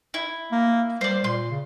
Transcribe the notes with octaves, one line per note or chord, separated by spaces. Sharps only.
E4
A#3
G3 C5 D5
A#2 C6
C#3